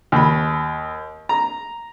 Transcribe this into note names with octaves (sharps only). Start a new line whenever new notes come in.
D#2 B5
A#5